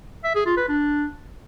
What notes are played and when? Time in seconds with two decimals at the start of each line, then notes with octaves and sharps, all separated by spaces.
0.24 E5
0.35 G#4
0.46 F4
0.57 B4
0.68 D4